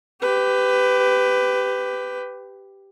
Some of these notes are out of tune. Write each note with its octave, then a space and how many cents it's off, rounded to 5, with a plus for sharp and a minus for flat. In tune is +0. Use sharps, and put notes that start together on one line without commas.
G4 +0 B4 +20